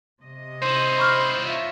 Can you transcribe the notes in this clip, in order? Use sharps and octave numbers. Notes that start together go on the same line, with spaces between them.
C3 D#5
D#4 E4 C5
B5 C#6 F6
F4 C#5 E5